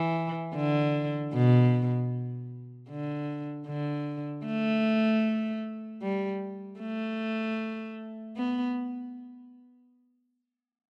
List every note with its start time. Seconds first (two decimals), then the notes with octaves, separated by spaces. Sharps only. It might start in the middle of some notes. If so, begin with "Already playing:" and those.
Already playing: E3
0.55 D3
1.34 B2
2.90 D3
3.68 D3
4.46 A3
6.02 G3
6.80 A3
8.36 B3